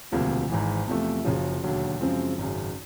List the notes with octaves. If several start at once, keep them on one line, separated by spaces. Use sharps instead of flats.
E1 D2 C3 F3 A#3
G#1 G#2 E3
E2 C3 F3 A3
F#1 F#2 C#3 F3
E1 D#2 D3 F#3
F#2 C#3 F3 G#3 C4
G#1 F#2 C#3